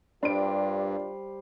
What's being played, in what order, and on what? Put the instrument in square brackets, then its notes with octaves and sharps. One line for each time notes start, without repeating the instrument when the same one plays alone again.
[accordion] G2 [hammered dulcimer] G3 C5 [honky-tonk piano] D4 D7 [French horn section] F4 A#4 D5